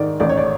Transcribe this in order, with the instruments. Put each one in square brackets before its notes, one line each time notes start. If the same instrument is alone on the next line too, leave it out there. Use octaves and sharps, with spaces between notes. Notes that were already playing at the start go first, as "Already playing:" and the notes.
Already playing: [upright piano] G#2 D#3 D5
A1 D5
C#5
D5